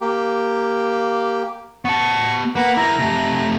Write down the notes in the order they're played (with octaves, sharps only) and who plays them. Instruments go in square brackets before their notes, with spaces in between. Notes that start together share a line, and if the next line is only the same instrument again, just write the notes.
[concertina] A#3 G4
[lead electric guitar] B3 A5 [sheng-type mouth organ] C#6
[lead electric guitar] A#3 [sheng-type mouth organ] B4 F#5
[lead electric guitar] E4 A#4 [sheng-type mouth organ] A#5
[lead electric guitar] C3 A3